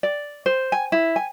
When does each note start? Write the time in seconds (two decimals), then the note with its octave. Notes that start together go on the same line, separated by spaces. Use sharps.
0.03 D5
0.46 C5
0.72 G#5
0.92 E4
1.16 G#5